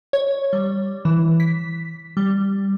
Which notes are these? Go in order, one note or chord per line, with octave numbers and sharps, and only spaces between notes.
C#5
G3
E3
B6
G3